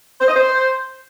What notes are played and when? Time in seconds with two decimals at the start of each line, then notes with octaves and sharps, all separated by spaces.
0.20 C5
0.28 D#5
0.35 C5